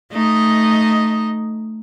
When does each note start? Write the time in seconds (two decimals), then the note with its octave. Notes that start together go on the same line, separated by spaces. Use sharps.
0.11 A3 D#4 D#5